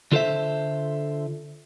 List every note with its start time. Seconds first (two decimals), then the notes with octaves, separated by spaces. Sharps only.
0.12 D3 F4 A4 B4 C5 E5